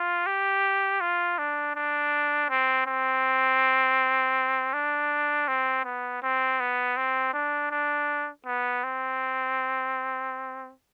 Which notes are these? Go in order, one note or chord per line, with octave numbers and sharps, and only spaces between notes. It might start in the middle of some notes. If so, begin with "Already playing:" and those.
Already playing: F4
G4
F4
D4
D4
C4
C4
D4
C4
B3
C4
B3
C4
D4
D4
B3
C4